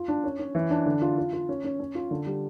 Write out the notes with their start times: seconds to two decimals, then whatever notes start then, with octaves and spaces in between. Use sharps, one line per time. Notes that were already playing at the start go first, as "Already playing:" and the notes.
Already playing: F4
0.08 D4
0.24 C#4
0.39 C#4
0.55 E3
0.70 D4
0.86 D3
1.02 F4
1.17 F4
1.33 F4
1.49 C#4
1.64 C#4
1.80 C#4
1.95 F4
2.11 D3
2.26 G3